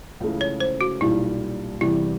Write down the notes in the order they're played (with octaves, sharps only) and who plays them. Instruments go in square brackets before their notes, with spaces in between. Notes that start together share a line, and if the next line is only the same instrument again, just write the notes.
[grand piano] C#2 C#3 E3 A3
[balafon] C#5
C5
F#4
[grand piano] B1 A#2 G3 [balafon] E4
[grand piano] E2 C3 E3 G3 [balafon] E4